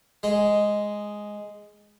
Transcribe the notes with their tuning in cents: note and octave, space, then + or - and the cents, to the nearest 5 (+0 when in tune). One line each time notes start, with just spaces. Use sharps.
G#3 +0 D#5 +0